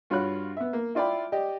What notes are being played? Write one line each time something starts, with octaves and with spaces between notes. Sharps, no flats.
G2 F4 F#4 C#5 B5 F#6
B3 E5
A#3
E4 F4 D5 G5 B5
G4 D5 D#5